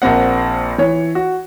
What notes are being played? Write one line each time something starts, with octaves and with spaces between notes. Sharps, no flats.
A#1 A#3 C4 F#5
E3 C#5
F#4